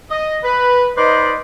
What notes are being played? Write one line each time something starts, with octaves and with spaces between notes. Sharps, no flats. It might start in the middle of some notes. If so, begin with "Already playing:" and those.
D#5
B4
D#4 B4 C5 D5 D#5